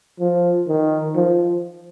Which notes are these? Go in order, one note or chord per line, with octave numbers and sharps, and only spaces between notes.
F3
D#3
F3